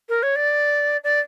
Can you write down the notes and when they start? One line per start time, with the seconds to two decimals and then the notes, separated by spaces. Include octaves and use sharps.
0.09 A#4
0.23 C#5
0.36 D5
1.04 D5